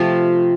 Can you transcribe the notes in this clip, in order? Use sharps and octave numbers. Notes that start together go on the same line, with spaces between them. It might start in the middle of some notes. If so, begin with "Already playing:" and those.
Already playing: C3 F3 A3 F4